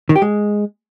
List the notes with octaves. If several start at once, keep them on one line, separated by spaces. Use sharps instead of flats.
D#3
G4
G#3